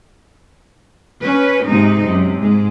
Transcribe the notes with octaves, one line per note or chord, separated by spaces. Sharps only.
C#4 B4
G#2 C3 G#3 D#4
F#2 C3
G#2 G#3